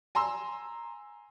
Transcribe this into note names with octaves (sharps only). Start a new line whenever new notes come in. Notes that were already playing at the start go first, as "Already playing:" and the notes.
G#5 A#5 C6 E6